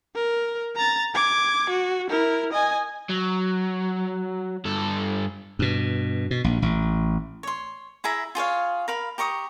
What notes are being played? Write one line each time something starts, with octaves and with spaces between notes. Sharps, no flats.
A#4
A#5 A6
D6 G#6
F#4
E4 A#4
D#5 G#5
F#3
G2 A4
G2 B2
B2
A#1
A1
C#5 C6
E4 G#4 E5 A#5
F4 G#4 C#5 F5
A#4 F5 B5
G4 A#5 C#6 D#6